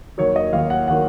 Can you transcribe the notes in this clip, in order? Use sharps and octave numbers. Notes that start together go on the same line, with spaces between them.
D#2 D#3 F#3 C#5
D#5
D#2 D#3 F#3 F5
F#5
D#3 F#3 F#5